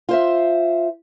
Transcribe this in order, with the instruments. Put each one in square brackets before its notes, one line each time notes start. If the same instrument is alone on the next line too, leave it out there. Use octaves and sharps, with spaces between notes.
[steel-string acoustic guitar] F4 C5 E5